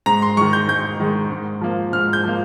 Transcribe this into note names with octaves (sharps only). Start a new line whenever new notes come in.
G#2 A#5
C6
D#3 G#3 C#6
G6
G#2 G6
D#3 G#3
G#2
F3 A#3
G#2 F6
G6
F3 A#3